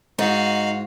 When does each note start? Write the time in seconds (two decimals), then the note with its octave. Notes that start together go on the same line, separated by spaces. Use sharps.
0.19 G#2 D#4 F#4 F5